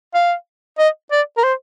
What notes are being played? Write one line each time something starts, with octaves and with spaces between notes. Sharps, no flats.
F5
D#5
D5
A#4
C5